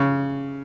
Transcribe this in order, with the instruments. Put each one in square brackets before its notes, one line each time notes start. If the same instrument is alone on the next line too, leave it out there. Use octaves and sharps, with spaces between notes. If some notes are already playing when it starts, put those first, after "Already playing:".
Already playing: [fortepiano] C#3